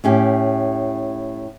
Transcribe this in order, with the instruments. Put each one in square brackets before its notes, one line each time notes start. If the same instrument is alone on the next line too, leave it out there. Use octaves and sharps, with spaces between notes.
[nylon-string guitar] A2 C#4 G4